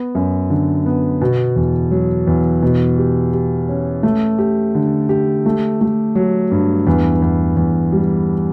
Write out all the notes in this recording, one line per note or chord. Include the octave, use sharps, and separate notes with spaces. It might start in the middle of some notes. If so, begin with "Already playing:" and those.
Already playing: B3
F#2
D3
B3
B2
E2
F#3
E2
B2
G4
G4
C#4
A3
G4
D3
G4
A3
A3
F#3
G2
E2
E2
E2
G3